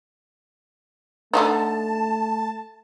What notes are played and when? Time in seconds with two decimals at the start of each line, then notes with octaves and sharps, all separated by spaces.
1.33 D3 A3 D4 D#4 A5